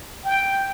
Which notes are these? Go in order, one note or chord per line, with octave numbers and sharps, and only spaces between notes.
G5